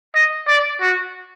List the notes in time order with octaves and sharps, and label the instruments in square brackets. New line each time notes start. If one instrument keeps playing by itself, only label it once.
[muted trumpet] D#5
D5
F#4